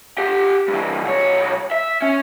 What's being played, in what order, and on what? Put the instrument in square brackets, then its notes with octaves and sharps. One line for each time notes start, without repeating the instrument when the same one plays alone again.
[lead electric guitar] G4 F#5
G2 E3
C2 C#5
E5
C#4